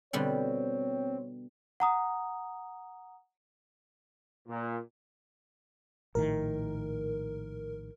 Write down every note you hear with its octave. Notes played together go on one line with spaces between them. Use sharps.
B2 D3 G3 C4 C#5
F#5 A#5 D#6
A#2
A#1 A2 D#3 A#4